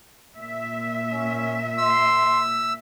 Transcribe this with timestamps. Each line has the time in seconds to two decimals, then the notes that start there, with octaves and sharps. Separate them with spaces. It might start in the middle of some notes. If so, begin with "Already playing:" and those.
0.37 A#2 E5
1.12 C#4
1.78 C6 E6